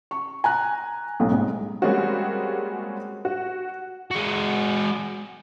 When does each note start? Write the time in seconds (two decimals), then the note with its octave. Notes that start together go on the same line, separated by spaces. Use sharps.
0.11 C#6
0.44 G#5 A#5 F#6
1.20 B1 A2
1.31 C2 G#2
1.82 G3 G#3 A#3 C4 C#4 F#4
3.25 F#4
4.11 G#3 F#4